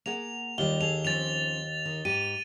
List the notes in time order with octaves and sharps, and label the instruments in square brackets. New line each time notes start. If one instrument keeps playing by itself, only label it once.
[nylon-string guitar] A#3 G#4 F#5 [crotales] F7
[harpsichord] D#2 [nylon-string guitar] G3 F4 [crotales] G7
[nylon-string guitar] G#4 A4 [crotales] F7
[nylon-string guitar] F3 C4 C#4 [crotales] A6 F7
[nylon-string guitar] D#3
[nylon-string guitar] G#2 G4 [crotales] D#7